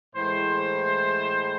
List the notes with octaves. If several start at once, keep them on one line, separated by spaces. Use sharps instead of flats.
A2 E3 G#3 C5